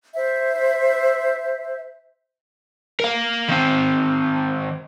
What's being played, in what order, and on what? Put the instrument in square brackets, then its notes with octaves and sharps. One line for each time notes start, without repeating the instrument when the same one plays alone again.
[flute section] C5 E5
[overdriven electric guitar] A#4 F5
D#3 C4